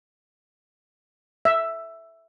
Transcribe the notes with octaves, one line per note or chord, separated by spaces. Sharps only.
E5